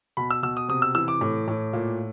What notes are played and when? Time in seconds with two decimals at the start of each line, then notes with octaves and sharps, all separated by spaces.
0.17 B2 B5
0.30 E6
0.43 B2 E6
0.57 D#6
0.69 C3 D#6
0.82 E6
0.95 E3 E6
1.08 D6
1.21 A2
1.48 A2
1.73 A#2